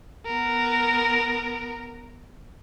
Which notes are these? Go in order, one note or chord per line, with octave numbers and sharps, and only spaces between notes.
B3 A#4